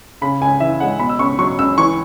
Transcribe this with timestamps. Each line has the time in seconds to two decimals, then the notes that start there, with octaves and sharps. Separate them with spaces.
0.22 C#3 B5
0.41 C#2 G#5
0.60 E3 E5
0.80 G#3 F#5
0.99 B2 B5
1.09 E6
1.19 C#2 C#6
1.39 F#3 C#6
1.59 C#2 E6
1.78 E3 C#6